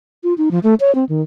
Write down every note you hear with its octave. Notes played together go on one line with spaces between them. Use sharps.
F4
D#4
F3
A3
C#5
C4
D#3